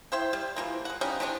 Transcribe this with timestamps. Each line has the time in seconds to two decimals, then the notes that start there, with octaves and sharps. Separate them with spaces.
0.12 E4 C5 G5
0.33 G3
0.56 E3 F3 A#3
0.85 G#3 F#5
1.01 F3 G3 C#4 D#4
1.20 C3 E3 B3 D4